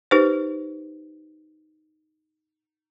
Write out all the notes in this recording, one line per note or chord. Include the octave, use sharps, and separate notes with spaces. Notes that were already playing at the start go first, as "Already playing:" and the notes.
D#4 G4 B4 C5